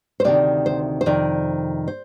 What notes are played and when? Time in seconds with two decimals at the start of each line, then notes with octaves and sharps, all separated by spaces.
0.20 C5
0.24 D2 C3 D#3 D5
0.66 C5
1.01 C5
1.06 F2 C3 D#3 D5
1.88 C5